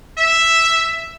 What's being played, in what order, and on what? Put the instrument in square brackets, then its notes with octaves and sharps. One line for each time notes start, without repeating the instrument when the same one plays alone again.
[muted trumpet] E5